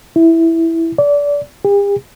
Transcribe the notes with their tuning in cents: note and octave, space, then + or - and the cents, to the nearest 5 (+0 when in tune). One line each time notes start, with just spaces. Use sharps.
E4 +0
D5 -25
G4 +45